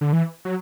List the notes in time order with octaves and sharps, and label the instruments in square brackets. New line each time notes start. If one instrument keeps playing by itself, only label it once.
[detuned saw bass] D3
E3
F#3